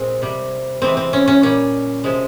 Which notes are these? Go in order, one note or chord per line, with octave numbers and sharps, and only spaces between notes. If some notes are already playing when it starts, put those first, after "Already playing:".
Already playing: A#2 G#3 C4
C3 G3
C3 E3 G#3 C4
C4
C#4
C#4
A#2 G3 C#4
C3 F3 G#3